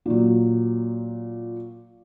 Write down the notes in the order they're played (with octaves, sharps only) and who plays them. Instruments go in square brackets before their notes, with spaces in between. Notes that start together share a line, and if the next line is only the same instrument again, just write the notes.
[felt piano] A#2 F#3